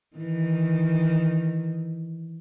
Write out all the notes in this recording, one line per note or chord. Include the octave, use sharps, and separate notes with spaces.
D#3 E3